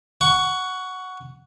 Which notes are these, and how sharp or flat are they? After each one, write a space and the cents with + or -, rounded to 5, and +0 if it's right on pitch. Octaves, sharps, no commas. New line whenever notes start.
F#5 +0 C#6 +15